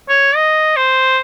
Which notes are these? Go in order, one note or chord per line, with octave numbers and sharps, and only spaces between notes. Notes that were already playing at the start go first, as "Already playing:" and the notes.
C#5
D#5
C5